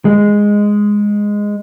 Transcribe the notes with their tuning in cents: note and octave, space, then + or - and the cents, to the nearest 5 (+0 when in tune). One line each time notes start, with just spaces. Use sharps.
G#3 -5